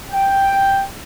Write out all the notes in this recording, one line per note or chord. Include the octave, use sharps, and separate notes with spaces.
G5